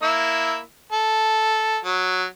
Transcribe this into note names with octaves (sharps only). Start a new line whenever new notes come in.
A#3 E4 E6
A4
F#3